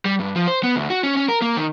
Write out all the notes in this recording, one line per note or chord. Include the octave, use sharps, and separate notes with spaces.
G3
G2
F3
C5
B3
D2
F#4
C#4
C#4
A#4
A#3
D#3